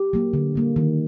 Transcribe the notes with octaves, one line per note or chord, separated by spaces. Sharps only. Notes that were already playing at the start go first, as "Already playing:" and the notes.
Already playing: G4
F#3 A#3
D3
G3 A#3
D#3